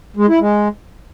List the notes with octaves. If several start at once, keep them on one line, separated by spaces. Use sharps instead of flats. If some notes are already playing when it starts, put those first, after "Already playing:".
G#3
E4
G#3